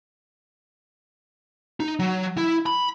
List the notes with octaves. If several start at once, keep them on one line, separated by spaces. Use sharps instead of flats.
D#4
F#3
E4
B5